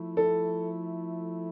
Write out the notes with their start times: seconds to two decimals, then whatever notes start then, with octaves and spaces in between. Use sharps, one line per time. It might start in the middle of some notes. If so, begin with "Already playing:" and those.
Already playing: F3 A3 E4
0.17 A4